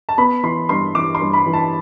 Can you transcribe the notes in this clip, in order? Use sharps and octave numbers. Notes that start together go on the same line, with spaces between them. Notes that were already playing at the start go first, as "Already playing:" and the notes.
A5
B3 B5
E3 C6
G2 C6
E3 D6
C6
G2
B5
E3
A5